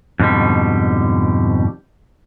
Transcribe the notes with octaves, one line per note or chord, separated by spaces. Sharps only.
F2 G#2 B2 D3 G3